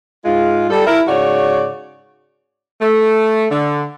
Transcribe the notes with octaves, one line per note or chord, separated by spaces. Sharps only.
G#2 G#3 F4
G3 A4
E4 A#4
G#2 C#3 F#4 C#5 D5
A3
D3